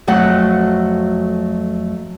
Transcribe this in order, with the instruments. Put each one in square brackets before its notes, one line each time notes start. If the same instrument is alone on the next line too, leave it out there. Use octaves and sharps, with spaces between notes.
[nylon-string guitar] F2 F#3 A3 F#4 F#5